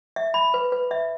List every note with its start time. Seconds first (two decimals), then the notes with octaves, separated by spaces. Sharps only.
0.16 E5
0.34 B5
0.54 B4
0.72 B4
0.91 E5